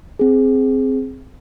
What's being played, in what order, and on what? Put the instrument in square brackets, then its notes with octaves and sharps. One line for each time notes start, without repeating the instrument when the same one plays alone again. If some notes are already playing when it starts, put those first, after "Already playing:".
[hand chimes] C4 G#4